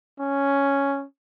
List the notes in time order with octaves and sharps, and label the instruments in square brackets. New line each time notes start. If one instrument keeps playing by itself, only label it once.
[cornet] C#4